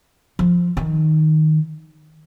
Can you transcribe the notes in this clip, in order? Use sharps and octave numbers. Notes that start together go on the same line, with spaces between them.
F3
D#3